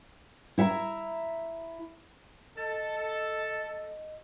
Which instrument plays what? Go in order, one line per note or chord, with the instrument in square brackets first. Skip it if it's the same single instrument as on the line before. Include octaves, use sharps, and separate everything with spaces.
[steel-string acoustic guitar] E4 E5 F#5 A#5
[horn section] A4 [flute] D#5